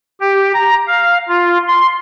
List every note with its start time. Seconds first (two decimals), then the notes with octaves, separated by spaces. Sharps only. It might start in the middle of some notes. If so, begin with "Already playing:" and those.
0.20 G4
0.54 A#5
0.87 F5
1.28 F4
1.68 C6